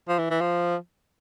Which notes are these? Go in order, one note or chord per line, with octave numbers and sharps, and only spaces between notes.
F3
E3
E3
F3